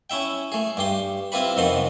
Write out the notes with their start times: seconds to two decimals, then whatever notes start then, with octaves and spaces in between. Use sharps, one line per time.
0.10 C#4 E4 E5 G5
0.52 A3 G#4
0.77 G2 G4 C6
1.32 C4 E4 F4 G4 B4 B5
1.57 F2 C3 D#3 F3 B3 C6